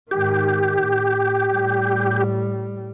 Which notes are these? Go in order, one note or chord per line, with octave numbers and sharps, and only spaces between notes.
G#2 D#3 G4
A2
A2 G3